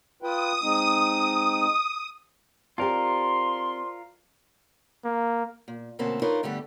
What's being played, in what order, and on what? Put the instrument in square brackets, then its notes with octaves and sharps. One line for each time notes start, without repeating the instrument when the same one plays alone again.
[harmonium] F4 B4 G5 [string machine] D#6
[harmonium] G#3 C4 D#4
[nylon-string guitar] C4 G4 [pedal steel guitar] F4 A#4 [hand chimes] C5 D5 A5 [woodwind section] C6
[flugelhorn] A#3
[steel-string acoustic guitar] A#2
D2 B2 A#3 C4 C#4 A5
D4 D#4 F4 A#4 B4 C#5
G2 D3 G3 A3 B3 G4